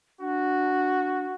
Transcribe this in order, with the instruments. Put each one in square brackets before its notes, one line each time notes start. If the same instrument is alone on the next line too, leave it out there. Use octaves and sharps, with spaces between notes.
[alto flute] D4 [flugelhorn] F#4